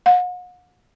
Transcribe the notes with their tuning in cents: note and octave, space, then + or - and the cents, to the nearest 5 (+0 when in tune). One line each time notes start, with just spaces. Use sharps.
F#5 -45